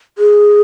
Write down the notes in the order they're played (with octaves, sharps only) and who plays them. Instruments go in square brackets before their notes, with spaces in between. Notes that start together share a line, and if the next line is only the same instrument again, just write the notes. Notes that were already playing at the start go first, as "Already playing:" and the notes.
[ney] G#4